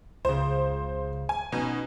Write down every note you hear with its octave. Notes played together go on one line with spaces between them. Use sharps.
C#2 C#3 C5
G#5
B2 C#4 D#4 G#5